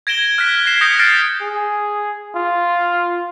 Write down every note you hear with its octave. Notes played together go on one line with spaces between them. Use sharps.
G#6 A#6 D7 E7 G7
F6 F#6 G#6 A#6 B6
G#6 A#6 C7 E7
D#6 G6 A#6 B6 C#7
D#6 F6 A6 A#6 C7 D7
G#4
F4